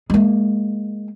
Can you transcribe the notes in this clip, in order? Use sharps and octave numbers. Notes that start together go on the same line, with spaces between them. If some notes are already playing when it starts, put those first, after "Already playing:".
G#3 A#3